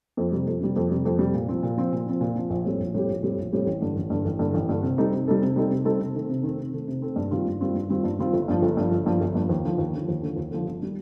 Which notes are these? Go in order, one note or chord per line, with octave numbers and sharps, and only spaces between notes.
F2
C3 G3
F2
C3 G3
F2
C3 G3
F2
C3 G3
A#2
F3 C4
A#2
F3 C4
A#2
F3 C4
A#2
F3 C4
A#1
A2 G3 C4 G4
A#1
A2 G3 C4 G4
A#1
A2 G3 C4 G4
A#1
A2 G3 C4 G4
A1
G2 D3
A1
G2 D3
A1
G2 D3
A1
G2 D3
C3
G3 C4 D#4 A4
C3
G3 C4 D#4 A4
C3
G3 C4 D#4 A4
C3
G3 C4 D#4 A4
C3
D#3 A3 C4
C3
D#3 A3 C4
C3
D#3 A3 C4
C3
D#3 A3 C4
G2
D#3 G3 C4 F4
G2
D#3 G3 C4 F4
G2
D#3 G3 C4 F4
G2
D#3 G3 C4 F4
G1
G2 F3
G1
G2 F3
G1
G2 F3
G1
G2 F3
D#2
D3 F3
D#2
D3 F3
D#2
D3 F3
D#2
D3 F3
G1
D#3 G3